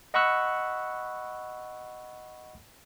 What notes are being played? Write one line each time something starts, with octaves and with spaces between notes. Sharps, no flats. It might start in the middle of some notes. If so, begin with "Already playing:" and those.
D#5 F#5 B5 C#6 E6 F#6